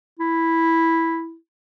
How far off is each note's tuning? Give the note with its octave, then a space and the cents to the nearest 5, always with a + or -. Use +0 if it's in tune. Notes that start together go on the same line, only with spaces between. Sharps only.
E4 -5